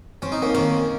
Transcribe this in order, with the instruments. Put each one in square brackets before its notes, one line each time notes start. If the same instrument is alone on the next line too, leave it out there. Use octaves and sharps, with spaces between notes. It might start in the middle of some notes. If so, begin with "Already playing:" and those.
[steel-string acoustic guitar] C4 [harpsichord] C#4
[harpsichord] D#4
A#3 C#4
[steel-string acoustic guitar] D#3 [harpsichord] A#3 C#4